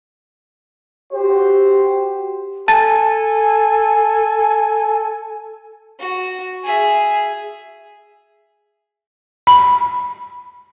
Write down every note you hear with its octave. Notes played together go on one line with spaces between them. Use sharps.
F#4 G4 C5
A4 G#5 A5 A6
F#4
G#4 E5
B5